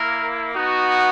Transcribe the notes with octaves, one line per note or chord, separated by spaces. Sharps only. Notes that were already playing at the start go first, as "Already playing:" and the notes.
Already playing: A#3 E4 A#4
B3 D#4 F#4